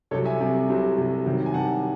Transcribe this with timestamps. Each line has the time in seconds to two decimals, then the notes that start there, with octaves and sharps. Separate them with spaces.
0.11 C2 C3 F#3 A4 C#5
0.25 E5 G#5
0.40 C2 C3 F#3
0.68 C2 C3 F#3
0.97 C2 C3 F#3
1.26 C2 C3 D#3 F#3
1.46 G#5
1.54 C2 C3 D#3 F#3 F#5 A5